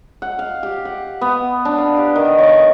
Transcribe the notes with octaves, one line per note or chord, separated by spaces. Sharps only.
F#5
F5
G4
F#5
B3
D4
F5
G4
D#3
C#5